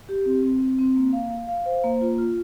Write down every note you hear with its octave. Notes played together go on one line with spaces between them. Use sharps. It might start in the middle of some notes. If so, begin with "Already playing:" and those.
G4
C4
C4
C4
C4
A#3
F5
F5
F5
C5
A#3
F4
F4